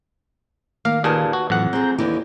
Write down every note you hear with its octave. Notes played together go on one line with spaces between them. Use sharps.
D#3 A#3 F5
D#2 A#2 G#4 B4 A5
F#4
F2 A2 E3 F#3 F#5
C4 G#4 A#5 G6
D#2 D3 E3 E4